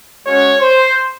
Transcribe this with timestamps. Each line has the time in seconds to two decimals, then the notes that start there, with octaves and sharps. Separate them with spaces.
0.25 G#3 C#4 F#4 C#5
0.61 C5